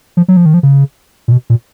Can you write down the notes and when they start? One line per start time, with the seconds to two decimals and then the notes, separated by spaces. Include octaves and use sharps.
0.17 F3
0.28 F#3
0.37 F3
0.46 D#3
0.54 F3
0.63 C#3
1.28 A#2
1.32 B2
1.50 A#2